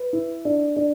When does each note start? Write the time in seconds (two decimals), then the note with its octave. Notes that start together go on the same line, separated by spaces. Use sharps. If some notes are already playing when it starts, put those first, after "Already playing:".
Already playing: B4
0.13 E4
0.45 D4
0.76 D4